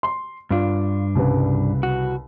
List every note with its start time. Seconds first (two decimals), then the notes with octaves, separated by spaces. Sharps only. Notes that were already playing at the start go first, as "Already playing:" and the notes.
0.03 C6
0.51 G2 D4 F4
1.15 C2 C#3 B4
1.83 F#4